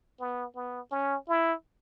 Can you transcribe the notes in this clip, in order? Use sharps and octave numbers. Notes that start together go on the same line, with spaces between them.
B3
B3
C#4
E4